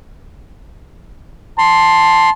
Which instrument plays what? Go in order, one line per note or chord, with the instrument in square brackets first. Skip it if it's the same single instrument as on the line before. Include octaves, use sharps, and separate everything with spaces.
[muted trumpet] A5 [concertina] C6